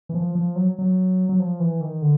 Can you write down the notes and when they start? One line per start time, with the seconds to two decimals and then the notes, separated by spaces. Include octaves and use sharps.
0.09 E3
0.14 F3
0.35 F3
0.56 F#3
0.78 F#3
1.29 F#3
1.40 F3
1.60 E3
1.81 D#3
2.02 D3